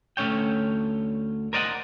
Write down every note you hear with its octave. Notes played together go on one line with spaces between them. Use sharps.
D2 A3 C#4 C#5 G5
A#4 C5 D5 D#5 F5 F#5